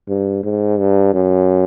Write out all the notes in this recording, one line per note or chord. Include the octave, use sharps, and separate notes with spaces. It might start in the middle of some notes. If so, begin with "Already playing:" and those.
G2
G#2
G2
F#2